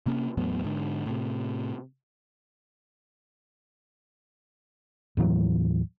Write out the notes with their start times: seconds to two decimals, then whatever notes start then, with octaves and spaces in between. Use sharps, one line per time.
0.06 C3 A#3 C#4
0.37 E2 A2 F#3 B3
0.64 G#2 D3
1.06 A2 C3
5.17 D#2 A2 E3 F#3